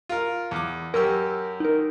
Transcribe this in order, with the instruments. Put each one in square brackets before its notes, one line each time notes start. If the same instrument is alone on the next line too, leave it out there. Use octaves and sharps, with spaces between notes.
[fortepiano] F4 A#4
E2 D6
[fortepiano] F#2 G4 [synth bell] A#4 E6
[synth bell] D#4 A#4